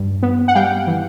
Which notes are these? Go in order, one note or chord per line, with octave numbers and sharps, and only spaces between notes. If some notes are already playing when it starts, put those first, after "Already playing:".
Already playing: G2
B3
F#5
G3 F5 G5
E3